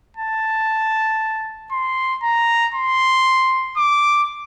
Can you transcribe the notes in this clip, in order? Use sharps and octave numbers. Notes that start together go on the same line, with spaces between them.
A5
C6
A#5
C6
D6